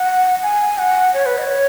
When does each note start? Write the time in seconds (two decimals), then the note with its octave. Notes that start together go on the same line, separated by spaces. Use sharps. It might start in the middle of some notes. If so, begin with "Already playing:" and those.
Already playing: F#5
0.43 G#5
0.78 F#5
1.14 C#5
1.26 B4
1.38 D#5
1.43 C#5